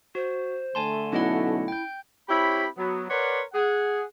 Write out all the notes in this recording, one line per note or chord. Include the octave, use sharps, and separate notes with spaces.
F#4 C5
D3 A3 G#5 A5 C6
B1 C#4 E4 D#5 F#5
G5 G6
C4 E4 G4 C#5 B5
F#3 B3
A#4 B4 C#5 D5 F#5 C6
G#4 F#5